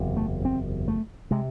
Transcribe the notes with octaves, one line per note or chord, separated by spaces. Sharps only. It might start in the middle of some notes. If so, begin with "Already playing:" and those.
Already playing: F#1 E2 C3
A3
C4
A3
C3 G#3